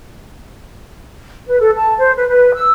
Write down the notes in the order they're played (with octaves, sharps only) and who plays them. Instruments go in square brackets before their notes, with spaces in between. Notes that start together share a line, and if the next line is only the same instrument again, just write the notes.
[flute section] B4
A4
A5
C5
B4
B4
E6